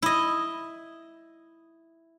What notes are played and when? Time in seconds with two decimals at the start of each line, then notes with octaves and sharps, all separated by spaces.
0.02 E4 D#5